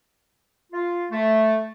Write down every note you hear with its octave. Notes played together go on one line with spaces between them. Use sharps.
F4
A3